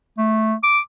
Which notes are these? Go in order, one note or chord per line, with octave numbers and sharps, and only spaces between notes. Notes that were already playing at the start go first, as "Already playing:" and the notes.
A3
D6